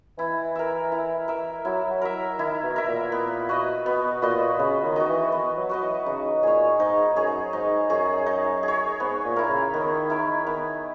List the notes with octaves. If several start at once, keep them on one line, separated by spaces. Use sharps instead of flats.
E3 E4
A#4 E5
E4
A#4 E5
F#3 E4
F#3
A#4 E5
D#3 E4
B2
A#4 E5
A#2
B3
F#4 B4 D#5
B2 B3
A#2 F#4 B4 D#5
C#3 B3
D#3
F#4 B4 D#5
E3
B3
F#3
F#4 B4 D#5
E3
C#3 D#4
A#2 G#4 C#5
G#2 D#4
F#2 G#4 C#5
G#2 D#4
F#2 G#4 C#5
D#4
G#4
C#5
G#2 B3
A#2
E4 A#4
C#3
D#3 B3
E4 A#4
D#3 B3